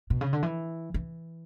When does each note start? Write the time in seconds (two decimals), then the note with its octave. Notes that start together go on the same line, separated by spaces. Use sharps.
0.10 B2
0.21 C#3
0.33 D3
0.43 E3
0.94 E3